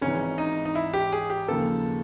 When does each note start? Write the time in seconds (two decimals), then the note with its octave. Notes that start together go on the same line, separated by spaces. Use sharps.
0.01 G#1 G#2 E3 C#4
0.38 D#4
0.65 D#4
0.75 E4
0.93 G4
1.12 G#4
1.30 G4
1.48 D#2 C#3 F3 A#3 A4